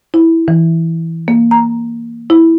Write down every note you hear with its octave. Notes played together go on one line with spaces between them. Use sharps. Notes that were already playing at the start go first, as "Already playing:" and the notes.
E4
E3
A#3
A#5
E4